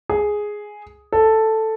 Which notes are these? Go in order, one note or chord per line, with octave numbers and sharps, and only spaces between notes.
G#4
A4